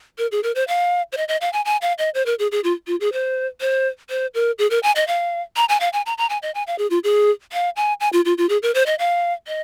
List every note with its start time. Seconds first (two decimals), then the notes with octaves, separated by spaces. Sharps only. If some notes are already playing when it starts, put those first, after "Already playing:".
0.18 A#4
0.32 G#4
0.43 A#4
0.55 C5
0.68 F5
1.12 C5
1.17 D#5
1.28 D#5
1.41 F5
1.53 G#5
1.65 G#5
1.82 F5
1.98 D#5
2.14 C5
2.26 A#4
2.39 G#4
2.52 G#4
2.64 F4
2.87 F4
3.00 G#4
3.13 C5
3.61 C5
4.10 C5
4.34 A#4
4.59 G#4
4.70 A#4
4.83 G#5
4.96 D#5
5.08 F5
5.56 A#5
5.69 G#5
5.80 F5
5.93 G#5
6.06 A#5
6.18 A#5
6.30 G#5
6.42 D#5
6.55 G#5
6.67 F5
6.79 G#4
6.90 F4
7.04 G#4
7.53 F5
7.76 G#5
8.00 G#5
8.13 F4
8.25 F4
8.38 F4
8.49 G#4
8.63 A#4
8.74 C5
8.86 D#5
8.99 F5
9.47 D#5